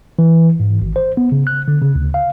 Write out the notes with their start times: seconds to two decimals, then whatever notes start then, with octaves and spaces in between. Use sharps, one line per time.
0.19 E3
0.60 G#2
0.81 G#1
0.96 C5
1.17 B3
1.32 C#3
1.47 F#6
1.68 D3
1.82 C#3
1.95 D2
2.14 F5